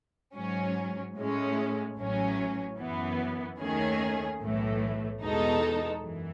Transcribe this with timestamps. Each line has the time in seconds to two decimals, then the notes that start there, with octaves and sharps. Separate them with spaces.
0.34 G#2 F#3 C#4
1.15 A2 G#3 C#4
1.96 A1 A2 F#3 C#4
2.77 F#2 E3 B3
3.59 D#2 D#3 A3 C#4 G#4
4.40 B1 A2 E3 A3
5.21 E2 B2 G#3 D#4 A4
6.02 F#2 E3